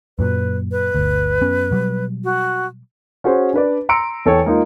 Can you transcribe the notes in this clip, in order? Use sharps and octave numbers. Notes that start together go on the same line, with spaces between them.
F#2 A#2 F#3 B4
B4
G1 D2
F#2 B3 C#4
B2 F#3 G3
F#4
C#4 F#4 G#4 C5
D4 B4 D5
A#5 C6 E6 C#7 D7
E2 A4 C#5 G5
G#3 A#3 D#4 F4